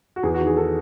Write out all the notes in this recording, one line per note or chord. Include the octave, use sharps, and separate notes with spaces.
F#4
E2 G#4
F#4
D#3
G#4
D#3 A4